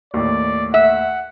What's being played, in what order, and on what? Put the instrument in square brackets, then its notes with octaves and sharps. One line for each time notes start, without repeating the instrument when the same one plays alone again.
[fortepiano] D#2 A2 [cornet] D5
[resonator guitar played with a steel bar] E5 [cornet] F#5